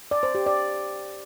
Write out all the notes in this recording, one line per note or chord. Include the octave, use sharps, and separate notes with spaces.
D5
C5
G4
D5